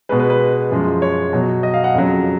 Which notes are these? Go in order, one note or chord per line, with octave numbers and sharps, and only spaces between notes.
B2 G#3 B4
B4
B4
F#2 F3 G#3
C#5
B2 F#3
D#5
F5
F#5
F2 C#3 F#3